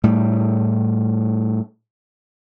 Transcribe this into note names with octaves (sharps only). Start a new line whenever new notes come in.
A2 G3